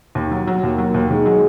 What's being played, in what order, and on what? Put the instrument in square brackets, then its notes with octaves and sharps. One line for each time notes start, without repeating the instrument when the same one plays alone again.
[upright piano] D#2
F#3
F#3
[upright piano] D#2 [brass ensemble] A#3
[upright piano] F#3
D#2
[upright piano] D#3 [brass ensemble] G#3
[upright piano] F#3